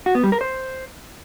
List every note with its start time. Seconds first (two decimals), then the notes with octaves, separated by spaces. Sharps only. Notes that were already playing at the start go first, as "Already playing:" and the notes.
0.06 F#4
0.15 B3
0.23 G3
0.32 A#4
0.41 C5